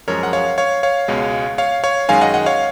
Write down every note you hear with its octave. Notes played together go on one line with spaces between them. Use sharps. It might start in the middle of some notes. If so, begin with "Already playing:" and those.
F#2 F3 G#3 A#4 C#5
F#5
C#5 F5
C#5 F5
C#5 F5
C#2 B2 G#3
C#5 F5
C#5 F5
F#2 D#3 G#3 F5 G#5
D#5 F#5
D#5 F#5
C#5 F5